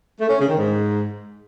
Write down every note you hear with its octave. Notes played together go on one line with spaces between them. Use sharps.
A3
C#4
C#3
D#3
G#2